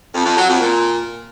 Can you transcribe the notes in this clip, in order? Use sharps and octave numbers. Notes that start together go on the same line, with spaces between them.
F2
F2
F#3
F2
A#2